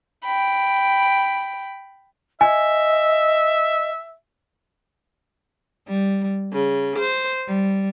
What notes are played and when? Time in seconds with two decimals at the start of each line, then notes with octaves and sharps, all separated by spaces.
0.24 G5 B5
2.41 D#5 E5 G#5
5.87 G3
6.52 C#3
6.98 C5
7.48 G3